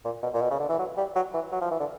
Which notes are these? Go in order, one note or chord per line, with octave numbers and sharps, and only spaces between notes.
A#2
B2
A#2
B2
C#3
D3
E3
F#3
G3
F#3
E3
F#3
F3
E3
D3